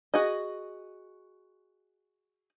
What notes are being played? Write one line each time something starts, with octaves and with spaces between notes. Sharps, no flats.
F#4 G#4 D#5